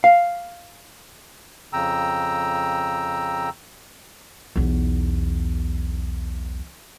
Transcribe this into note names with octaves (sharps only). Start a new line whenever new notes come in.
F5
F2 C#3 G5 A#5 E6
B1 E2